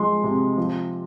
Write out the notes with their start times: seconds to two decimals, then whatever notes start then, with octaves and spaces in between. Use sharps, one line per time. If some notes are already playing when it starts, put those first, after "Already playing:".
Already playing: F3 G#3 C6
0.24 C3
0.58 F3